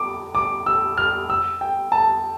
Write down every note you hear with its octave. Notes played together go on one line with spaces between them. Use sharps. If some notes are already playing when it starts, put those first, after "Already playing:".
Already playing: D6
D6
E6
F6
E6
G5
A5